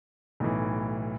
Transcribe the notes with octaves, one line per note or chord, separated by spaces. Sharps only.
B1 A2 E3